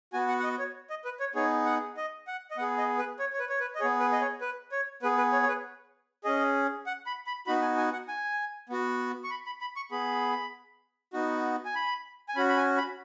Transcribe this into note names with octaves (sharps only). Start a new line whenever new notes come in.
B3 F#4 G#5
F#5
F#5
D#5
C#5
D#5
B4
C#5
B3 D#4 G#4 C#5
F#5
D#5
F#5
D#5
B3 G#4 F#5
D#5
B4
C#5
C#5
B4
C#5
B4
D#5
B3 G#4 C#5
B4
D#5
C#5
B4
C#5
B3 G#4 B4
B4
C#5
C#5
B4
C#4 G#4 D#5
F#5
B5
B5
B3 D#4 F#4 B5
G#5
G#5
F#5
G#5
B3 F#4
C#6
B5
B5
B5
C#6
B3 G#4 B5
B3 D#4 F#4
G#5
B5
G#5
C#4 F#4 B5
B5
G#5
B5